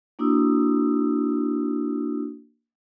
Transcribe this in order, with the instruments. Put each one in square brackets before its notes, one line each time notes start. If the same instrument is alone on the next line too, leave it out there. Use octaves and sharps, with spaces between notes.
[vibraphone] A#3 D4 E4 F#4 D#6 E6